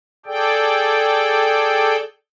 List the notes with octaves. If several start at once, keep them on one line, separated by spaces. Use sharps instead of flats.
G#4 A4 D5 G5